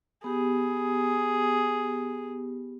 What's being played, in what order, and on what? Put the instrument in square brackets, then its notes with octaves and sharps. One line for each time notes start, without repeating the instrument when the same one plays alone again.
[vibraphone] B3 G4 [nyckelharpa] G#4